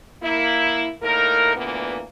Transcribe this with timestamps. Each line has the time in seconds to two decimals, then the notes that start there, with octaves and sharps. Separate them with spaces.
0.22 A#3 E4
1.03 A2 A#3 D#4 A#4
1.56 D2 A#2 E3 A#3 B3